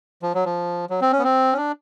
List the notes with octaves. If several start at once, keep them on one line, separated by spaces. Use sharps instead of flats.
F3
F#3
F3
F#3
C4
C#4
B3
C4
C#4
D4